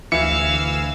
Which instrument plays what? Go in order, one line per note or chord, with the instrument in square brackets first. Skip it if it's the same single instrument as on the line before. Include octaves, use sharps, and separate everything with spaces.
[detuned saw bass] D2 [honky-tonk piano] E3 E4 [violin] F5 E6 [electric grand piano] C#7